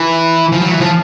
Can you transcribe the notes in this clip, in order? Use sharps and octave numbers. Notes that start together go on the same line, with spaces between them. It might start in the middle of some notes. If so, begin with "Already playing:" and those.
Already playing: E3
F3
F#3
E3
F3